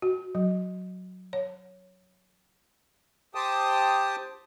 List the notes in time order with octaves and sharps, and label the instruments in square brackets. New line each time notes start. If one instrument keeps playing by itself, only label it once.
[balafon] F#4
F#3
C#5
[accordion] G4 C5 G5 A5 D#6